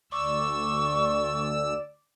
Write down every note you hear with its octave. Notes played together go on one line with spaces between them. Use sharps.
D2 D5 C#6 E6